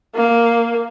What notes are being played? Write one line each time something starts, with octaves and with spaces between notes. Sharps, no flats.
A#3